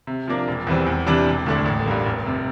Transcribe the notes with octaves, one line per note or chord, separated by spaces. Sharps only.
C3
F3 A#3 D4
E1
E2 E3 G3 C4
E2
C3 E3 G3 D4
E1
D2 D3 A3 D4
A1
G2 D3 G3 A#3
F1
C3